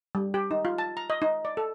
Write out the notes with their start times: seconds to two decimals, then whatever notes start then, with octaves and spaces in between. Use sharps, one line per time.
0.15 G3
0.34 G4
0.51 D#4
0.65 F4
0.78 A5
0.97 A#5
1.10 D#5
1.22 D#4
1.45 D5
1.57 A4